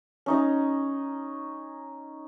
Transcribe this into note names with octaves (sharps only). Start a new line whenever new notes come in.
C#4 D#4 D#5